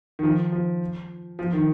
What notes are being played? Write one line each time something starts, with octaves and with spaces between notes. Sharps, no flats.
D#3
F3
F3
F3
D#3